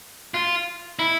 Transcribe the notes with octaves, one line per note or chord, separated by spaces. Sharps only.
F4
E4